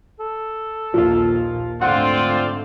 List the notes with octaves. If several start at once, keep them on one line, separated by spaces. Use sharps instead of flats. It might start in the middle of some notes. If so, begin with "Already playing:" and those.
A4
A#1 D#2 A#2 F3 F4
G#2 D3 A3 C4 F4 D5 F#5